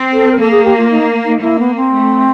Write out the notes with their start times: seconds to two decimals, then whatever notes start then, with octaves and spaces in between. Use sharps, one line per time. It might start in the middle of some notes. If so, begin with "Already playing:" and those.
Already playing: C4
0.13 A4
0.32 A#4
0.39 A#3 A4
0.51 G#4
0.65 G4
0.77 F4
0.91 D#4
1.25 D#4
1.41 A#3 E4
1.59 B3
1.76 C4
1.93 A3